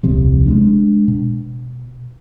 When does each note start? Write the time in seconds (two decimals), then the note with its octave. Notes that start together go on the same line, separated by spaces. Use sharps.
0.03 D#1 C2 C3 F3
0.46 G#3 B3 D4
1.08 B2